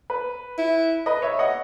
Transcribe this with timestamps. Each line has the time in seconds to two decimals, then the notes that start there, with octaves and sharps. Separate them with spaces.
0.10 B4
0.58 E4
1.06 B4 D#5
1.22 C#5 E5
1.39 D#5 F#5